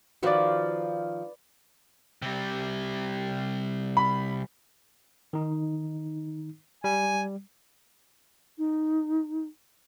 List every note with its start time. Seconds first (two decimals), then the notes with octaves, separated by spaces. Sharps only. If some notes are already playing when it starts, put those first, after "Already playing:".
0.23 D#3 F3 F#4 B4 D5
2.22 C3 G3
3.97 B5
5.33 D#3 D#4
6.84 G3 G#5
8.58 D#4